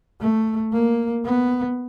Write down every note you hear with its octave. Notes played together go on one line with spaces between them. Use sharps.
A3
A#3
B3